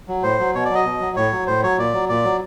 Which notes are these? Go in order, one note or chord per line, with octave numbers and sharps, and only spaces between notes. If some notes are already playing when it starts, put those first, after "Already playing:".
F#3
A2 C5
F#3
B2 C#5
D5
F#3 D#5
B2
F#3
A2 C#5
F#3
A2 C5
F#3 C#5
A#2 D5
F#3
A#2 D5
F#3